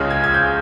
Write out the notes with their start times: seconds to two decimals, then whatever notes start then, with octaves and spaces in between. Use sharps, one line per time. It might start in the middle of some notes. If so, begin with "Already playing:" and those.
Already playing: C#2 C#3 G#3
0.10 G#6
0.24 G#6
0.34 G6